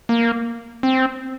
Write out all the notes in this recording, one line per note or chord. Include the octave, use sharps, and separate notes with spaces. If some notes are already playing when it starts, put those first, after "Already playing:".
A#3
C4